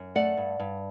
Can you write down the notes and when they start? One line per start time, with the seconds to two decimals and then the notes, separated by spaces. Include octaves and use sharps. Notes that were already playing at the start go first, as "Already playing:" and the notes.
Already playing: F#2
0.15 A3 D5 F#5
0.37 G2
0.60 G2